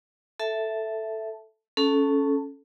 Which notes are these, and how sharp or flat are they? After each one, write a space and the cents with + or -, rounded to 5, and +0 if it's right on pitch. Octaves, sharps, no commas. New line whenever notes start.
A4 +0 E5 +0 A5 +0
C#4 +0 A4 -15 A5 +20